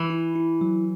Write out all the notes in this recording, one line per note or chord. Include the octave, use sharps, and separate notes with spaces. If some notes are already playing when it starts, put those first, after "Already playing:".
Already playing: E3
E4
E4
F#3